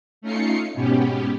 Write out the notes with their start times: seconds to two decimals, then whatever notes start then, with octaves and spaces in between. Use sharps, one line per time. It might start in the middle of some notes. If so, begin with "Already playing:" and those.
0.22 A3 C#4 D#4 F4 C7 C#7
0.74 G#2 B2 B3 C#4 G4